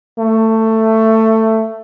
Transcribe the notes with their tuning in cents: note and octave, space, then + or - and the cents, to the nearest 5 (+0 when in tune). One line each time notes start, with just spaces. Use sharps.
A3 +15